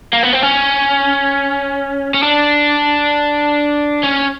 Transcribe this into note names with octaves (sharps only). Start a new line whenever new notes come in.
A#3
B3
C4
C#4
C#4
D4
C#4